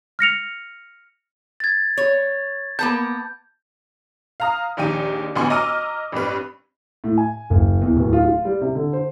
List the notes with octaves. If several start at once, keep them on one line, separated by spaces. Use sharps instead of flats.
F6 A#6 C#7 F7
G#6 A6
C#5
A#3 B3 A5 G6
F5 A#5 D#6
A#1 D#2 D#4 G5 D#7
A1 D2 B3 G#5 C6 C#6
D#5 A#5 D6 E6 F6 D#7
A1 G2 C4 B4
A2
G#5
F#1
E2
D1
F4
F4
G3
C3
D3
C5